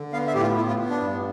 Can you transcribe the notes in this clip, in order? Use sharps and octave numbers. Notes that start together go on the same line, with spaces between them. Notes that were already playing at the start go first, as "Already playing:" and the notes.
Already playing: D3
B3 F5
E5
A2 G4
F4
B3 E4
F4
B3
D4
G2